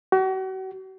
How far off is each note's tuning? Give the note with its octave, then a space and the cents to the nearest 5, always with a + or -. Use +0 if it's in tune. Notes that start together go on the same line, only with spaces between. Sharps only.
F#4 +40